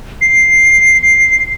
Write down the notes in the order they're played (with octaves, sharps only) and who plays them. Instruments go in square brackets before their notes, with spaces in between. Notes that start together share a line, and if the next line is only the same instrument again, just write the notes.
[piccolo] C7